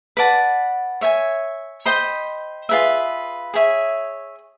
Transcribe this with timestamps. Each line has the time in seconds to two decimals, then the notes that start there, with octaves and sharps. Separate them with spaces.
0.17 B4 D5 F#5 A5
1.01 C#5 E5 G#5
1.86 C5 D#5 G5 B5
2.69 F4 G#4 B4 E5
3.54 G#4 C#5 E5